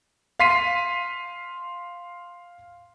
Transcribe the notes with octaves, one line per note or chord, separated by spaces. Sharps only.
F5 C6 B6 C7 D#7